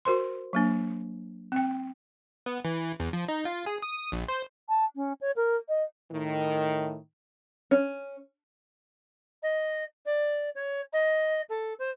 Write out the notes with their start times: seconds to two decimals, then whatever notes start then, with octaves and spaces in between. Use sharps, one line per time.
0.05 F#4 A#4 C5 C6
0.53 F#3 A#3 D4
1.52 C4 G5
2.46 B3
2.65 E3
3.00 E2
3.13 F3
3.28 D#4
3.45 F4
3.66 G#4
3.82 D#6
4.12 A#1
4.28 C5
4.69 A5
4.96 C#4
5.21 C#5
5.36 A#4
5.69 D#5
6.12 A2 D#3
7.71 C#4
9.43 D#5
10.05 D5
10.55 C#5
10.93 D#5
11.49 A4
11.79 C5